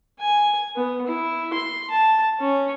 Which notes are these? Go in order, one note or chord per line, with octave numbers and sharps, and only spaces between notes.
G#5
B3
E4
C6
A5
C#4